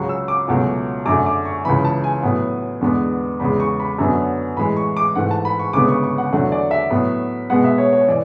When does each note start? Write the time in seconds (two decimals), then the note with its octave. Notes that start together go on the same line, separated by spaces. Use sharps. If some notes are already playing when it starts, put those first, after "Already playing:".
Already playing: C#2 C#3 F#3 C#6
0.09 E6
0.28 D6
0.48 C#2 B2 F#3 A3
1.06 F#2 D3 A3 D6
1.26 D6
1.45 C#6
1.65 C#2 C#3 E3 B5
1.85 A5
2.04 G#5
2.23 A2 F#3 B3
2.81 E2 D3 G#3 B3
3.40 E2 C#3 G#3 B5
3.60 C#6
3.80 B5
3.98 F#2 D3 F#3 B3
4.57 A2 E3 G#3 B5
4.77 C#6
4.97 D6
5.15 G#2 E3 A3 F#5
5.31 A5
5.45 B5
5.59 C#6
5.73 D2 C#3 G#3 B3 D6
5.88 C#6
6.03 C#6
6.18 F#5
6.32 E2 D3 F#3 A3 F#5
6.52 D5
6.71 E5
6.90 A2 F#3 B3
7.50 B2 G#3 B3 F#5
7.64 E5
7.78 C#5
7.93 C#5
8.09 E3 D5